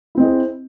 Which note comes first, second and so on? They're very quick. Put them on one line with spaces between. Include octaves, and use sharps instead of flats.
E4 C4 D#5 G#4